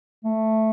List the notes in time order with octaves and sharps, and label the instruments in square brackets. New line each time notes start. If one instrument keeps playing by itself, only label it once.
[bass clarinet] A3